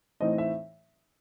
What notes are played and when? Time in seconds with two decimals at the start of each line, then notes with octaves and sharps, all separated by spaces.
0.20 A2 E3 C4 D#4 D#5
0.38 E5